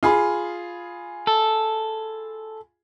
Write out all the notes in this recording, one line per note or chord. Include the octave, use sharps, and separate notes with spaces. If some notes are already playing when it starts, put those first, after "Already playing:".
F4 G#4 B5
A4